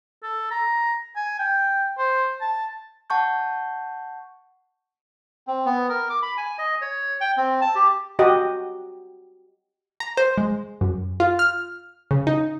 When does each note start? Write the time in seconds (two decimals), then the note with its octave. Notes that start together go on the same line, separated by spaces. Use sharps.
0.23 A4
0.51 A#5
1.16 G#5
1.39 G5
1.98 C5
2.41 A5
3.10 F#5 A5 C#6 G6
5.47 C4
5.66 B3
5.89 A#4
6.10 D6
6.22 B5
6.38 G#5
6.58 D#5
6.81 C#5
7.21 G5
7.37 C4
7.61 A5
7.75 G4
8.19 F#4 G4 D#5
10.00 A#5
10.17 C5
10.38 G#3
10.81 F#2
11.20 F4
11.39 F6
12.11 C#3
12.27 D#4